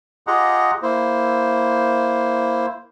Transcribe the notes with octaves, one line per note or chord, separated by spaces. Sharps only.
F4 G4 G#4 D#5 F#5 A#5
A#3 E4 C5